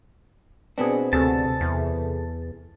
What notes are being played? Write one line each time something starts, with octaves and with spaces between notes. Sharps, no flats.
B2 B3 C4 D4 G#4
D2 C3 G#4 A4 A5
E2